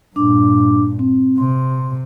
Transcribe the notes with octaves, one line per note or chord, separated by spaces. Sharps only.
G2 A#2 D4 D6
C4
C3 C6